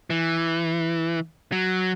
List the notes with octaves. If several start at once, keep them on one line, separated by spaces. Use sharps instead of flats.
E3
F#3